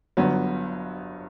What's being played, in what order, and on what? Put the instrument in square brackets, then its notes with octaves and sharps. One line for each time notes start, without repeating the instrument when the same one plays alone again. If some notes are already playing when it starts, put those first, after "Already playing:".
[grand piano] G1 G2 F#3 B3